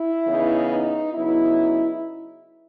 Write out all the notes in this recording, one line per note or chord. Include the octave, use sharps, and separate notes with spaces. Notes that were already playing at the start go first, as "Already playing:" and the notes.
Already playing: E4
C#3 E3 B3 D#4
D#4
C#3 F#3 B3 D#4 E4